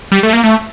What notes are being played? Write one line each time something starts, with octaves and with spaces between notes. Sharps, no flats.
G3
A3
A#3
A3